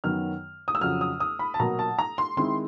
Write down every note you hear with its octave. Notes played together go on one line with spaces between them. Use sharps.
F#2 D#3 F#3 B3 F6
D#6
E6
F2 C#3 F#3 F6
D#6
D#6
B5
A5
B2 F#3 A#3 A#5
A5
A#5
C6
D#3 G#3 C4 E4 C6